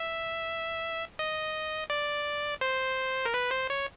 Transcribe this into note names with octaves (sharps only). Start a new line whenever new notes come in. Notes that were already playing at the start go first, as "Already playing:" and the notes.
Already playing: E5
D#5
D5
C5
A#4
B4
C5
C#5